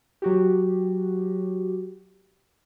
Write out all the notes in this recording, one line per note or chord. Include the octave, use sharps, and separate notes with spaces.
F#3 F#4 G4